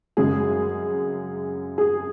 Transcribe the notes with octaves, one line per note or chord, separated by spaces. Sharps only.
F#2 C#3 G#3 G#4
G#4